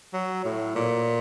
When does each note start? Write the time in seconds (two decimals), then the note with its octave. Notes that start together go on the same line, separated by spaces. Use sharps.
0.14 F#3
0.44 A2
0.76 A#2